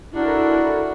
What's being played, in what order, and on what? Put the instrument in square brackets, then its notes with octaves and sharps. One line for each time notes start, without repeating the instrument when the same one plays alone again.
[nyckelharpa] D4 F#4 [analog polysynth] E4 A4 A#4